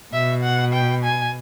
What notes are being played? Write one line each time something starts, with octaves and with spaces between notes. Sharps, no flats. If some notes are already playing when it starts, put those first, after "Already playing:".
B2 E5
F#5
G5
G#5